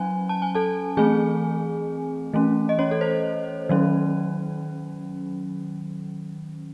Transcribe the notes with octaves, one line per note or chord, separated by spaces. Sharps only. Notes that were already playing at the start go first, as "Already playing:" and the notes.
Already playing: F#3 C#4 G#5
A5
G#5
A4 A5
E3 A3 C4 G#4 G#5
E3 A3 C#4
D#5
C#4 C#5
A4
C5
D#3 F#3 C#4